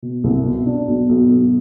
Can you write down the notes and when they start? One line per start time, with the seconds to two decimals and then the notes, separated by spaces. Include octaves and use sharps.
0.02 B2
0.24 C2
0.45 B2
0.66 D4
0.88 B1
1.09 B1
1.30 B1